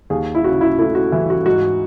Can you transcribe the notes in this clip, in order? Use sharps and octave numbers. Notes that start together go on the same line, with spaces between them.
D#2 G#4
E4
C#3 F#4
E4
A3 E4
F#4
E3 E5
F#4
G#2 F#4